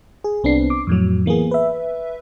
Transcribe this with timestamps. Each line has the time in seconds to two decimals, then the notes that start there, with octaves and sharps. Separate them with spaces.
0.24 G#4
0.44 C2 B3 C4 D4 C7
0.70 D6
0.87 F2 A2 F#3
1.26 E3 A#3 B3 G#4
1.51 B4 E5